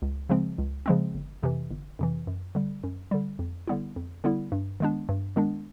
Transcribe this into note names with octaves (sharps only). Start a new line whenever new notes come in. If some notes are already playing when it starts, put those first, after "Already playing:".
C#2
C#3 F3 G#3 C4
C#2
C#3 F3 G#3 C4
G1
F2 C3 E3
G1
F2 C3 E3
F#2
D3 G3
F#2
D3 G3
F2
D3 G3 B3 E4
F2
D3 G3 B3 E4
G2
D#3 G#3 B3 D4
G2
D#3 G#3 B3 D4